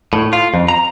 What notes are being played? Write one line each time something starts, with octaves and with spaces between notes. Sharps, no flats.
A2
F4
F2
A#5